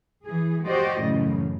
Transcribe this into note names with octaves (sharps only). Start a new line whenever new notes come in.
E3 G#4
F#4 G4 C5 D5 D#5
F#2 A2 C#3 E3